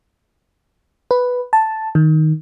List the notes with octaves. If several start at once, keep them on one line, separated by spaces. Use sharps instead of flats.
B4
A5
D#3